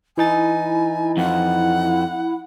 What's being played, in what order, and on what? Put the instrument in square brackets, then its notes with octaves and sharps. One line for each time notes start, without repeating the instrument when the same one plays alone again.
[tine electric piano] E3 D#4 A6 [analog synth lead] E4 [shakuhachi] G#5
[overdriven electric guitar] F2 [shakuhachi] F#5